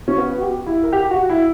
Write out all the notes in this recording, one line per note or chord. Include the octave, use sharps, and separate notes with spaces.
C#4
B3
F#4
G4
E4
A#4
G4
F#4
E4